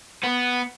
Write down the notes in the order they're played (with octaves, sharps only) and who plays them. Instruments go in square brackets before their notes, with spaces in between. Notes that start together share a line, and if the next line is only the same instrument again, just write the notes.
[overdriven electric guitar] B3